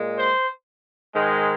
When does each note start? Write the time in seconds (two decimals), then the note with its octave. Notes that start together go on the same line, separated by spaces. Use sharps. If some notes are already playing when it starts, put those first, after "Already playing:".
Already playing: A#2 G#3
0.18 C5
1.14 G#2 D#3 G#3